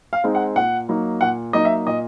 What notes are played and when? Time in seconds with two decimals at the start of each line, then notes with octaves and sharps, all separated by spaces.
0.13 F5
0.24 G#3 C4 D#4
0.35 F#5
0.56 A#2 F#5
0.89 F#3 A#3 D#4
1.21 A#2 F#5
1.53 F#3 A#3 D#4 D#5
1.65 E5
1.87 A#2 D#5